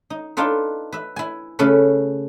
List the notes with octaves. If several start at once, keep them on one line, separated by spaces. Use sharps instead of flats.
D#4
D4 D#4 F4 A4 B4
B4 E5
E4 G#5
C#3 A3 C#4 A4 B4